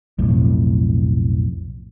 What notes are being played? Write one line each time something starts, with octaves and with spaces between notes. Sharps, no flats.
B1 F2 A2